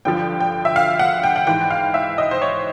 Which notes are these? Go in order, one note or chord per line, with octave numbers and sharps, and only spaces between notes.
G2 D3 F3 G5
G5
E5
F5
F#5
G5
F#5
G#2 E3 G5
F5
E5
D#5
C5
C#5